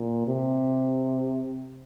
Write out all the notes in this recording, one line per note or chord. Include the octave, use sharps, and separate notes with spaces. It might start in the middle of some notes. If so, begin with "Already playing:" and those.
Already playing: A#2
C3